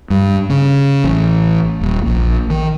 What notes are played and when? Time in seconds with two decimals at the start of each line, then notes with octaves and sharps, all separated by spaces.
0.10 G2
0.50 C#3
1.04 A1
1.81 D#1
2.06 A#1
2.50 D#3